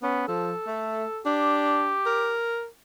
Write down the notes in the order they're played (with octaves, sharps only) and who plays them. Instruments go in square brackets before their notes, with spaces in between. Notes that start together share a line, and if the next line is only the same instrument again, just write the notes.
[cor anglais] B3 [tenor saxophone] C#4
[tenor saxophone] F3 [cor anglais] A4
[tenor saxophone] A3
[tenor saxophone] D4 [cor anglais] G4
[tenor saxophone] A#4